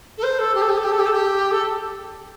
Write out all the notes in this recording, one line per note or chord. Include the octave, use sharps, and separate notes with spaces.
A4
C5
A4
G4
A4
G4
A4
G4
A4
G4
A4
G4
A4